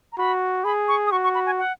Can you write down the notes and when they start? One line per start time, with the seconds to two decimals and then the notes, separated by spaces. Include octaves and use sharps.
0.13 A#5
0.18 F#4 B5
0.65 G#4 B5
0.88 C#6
1.07 D#6
1.12 F#4 C#6
1.24 C#6
1.35 B5
1.46 G#5
1.59 F#5